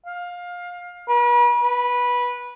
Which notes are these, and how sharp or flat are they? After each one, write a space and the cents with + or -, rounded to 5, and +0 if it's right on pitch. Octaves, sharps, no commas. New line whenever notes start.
F5 +20
B4 -40
B4 -15